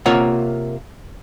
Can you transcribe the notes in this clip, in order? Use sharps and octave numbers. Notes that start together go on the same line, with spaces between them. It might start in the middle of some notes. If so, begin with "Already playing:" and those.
C3 A#3 F4 A#4 C#5 F#5